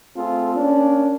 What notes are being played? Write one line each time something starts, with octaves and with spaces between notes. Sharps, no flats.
A3 C4 F4 G#4 A4
A#3 C#4 D4